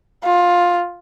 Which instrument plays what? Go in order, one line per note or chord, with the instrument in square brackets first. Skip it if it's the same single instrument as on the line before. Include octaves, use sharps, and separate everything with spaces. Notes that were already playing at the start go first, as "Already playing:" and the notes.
[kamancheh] F4